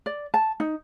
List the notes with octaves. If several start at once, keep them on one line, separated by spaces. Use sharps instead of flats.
D5
A5
D#4